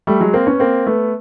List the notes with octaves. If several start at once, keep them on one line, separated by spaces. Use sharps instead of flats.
G3 A3
F#3 G#3
A#3 C4
B3 C#4
A#3 C4
A3 B3